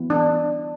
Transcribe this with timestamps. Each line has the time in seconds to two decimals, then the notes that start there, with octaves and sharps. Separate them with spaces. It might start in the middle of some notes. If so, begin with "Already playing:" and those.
Already playing: E3 B3
0.10 D4